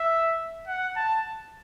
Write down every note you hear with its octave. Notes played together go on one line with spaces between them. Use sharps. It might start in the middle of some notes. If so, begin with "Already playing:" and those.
Already playing: E5
F#5
A5